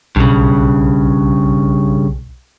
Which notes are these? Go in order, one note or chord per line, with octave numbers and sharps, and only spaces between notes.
B1 G2 C#3